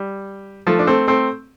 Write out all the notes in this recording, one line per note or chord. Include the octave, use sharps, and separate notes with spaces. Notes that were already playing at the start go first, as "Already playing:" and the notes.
Already playing: G3
F3 A3
D4
A3 C4
A3 C4